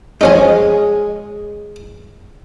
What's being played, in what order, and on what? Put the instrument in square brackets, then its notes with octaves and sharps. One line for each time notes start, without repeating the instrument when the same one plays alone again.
[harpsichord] F3 C#4 D#4 [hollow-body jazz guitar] G#3 G#4